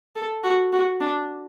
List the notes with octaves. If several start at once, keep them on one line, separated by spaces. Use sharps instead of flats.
A4
F#4
F#4
D4